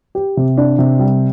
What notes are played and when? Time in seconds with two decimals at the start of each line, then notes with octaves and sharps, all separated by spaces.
0.15 G4
0.37 C3
0.57 D4
0.79 C3
0.99 G3